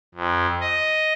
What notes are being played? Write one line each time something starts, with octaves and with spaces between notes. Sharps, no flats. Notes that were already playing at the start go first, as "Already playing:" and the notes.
F2
D#5